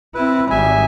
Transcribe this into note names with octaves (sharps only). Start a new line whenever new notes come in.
C4 E4 B4
G#1 G3 E5 G#5